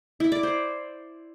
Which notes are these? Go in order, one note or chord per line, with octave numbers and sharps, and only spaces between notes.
E4
D5
C5